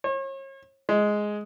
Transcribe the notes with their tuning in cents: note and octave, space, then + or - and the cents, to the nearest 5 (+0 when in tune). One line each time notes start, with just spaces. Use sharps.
C#5 -40
G#3 +5